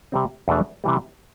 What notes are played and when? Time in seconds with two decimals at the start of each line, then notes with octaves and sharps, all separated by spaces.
0.12 C3 G3 C4
0.48 E2 B2 A3 D4
0.84 C3 E3 G3